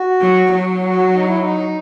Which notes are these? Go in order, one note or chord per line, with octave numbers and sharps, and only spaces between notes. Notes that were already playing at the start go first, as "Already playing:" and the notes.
Already playing: F#4
F#3
F#3
F#4
D#4
E4
D#4